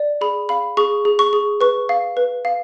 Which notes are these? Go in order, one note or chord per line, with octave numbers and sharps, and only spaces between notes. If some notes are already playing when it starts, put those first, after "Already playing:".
Already playing: D5
G#4 B5
F5 B5
G#4 C#6
G#4
C#6
G#4
B4 C#6
F5
B4
F5